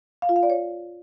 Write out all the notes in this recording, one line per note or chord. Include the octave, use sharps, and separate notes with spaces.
F5
F4
F5
D5
C#5